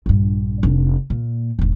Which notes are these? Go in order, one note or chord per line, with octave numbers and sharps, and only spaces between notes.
A#1 G2
F1 D4
A#2
E1 G#2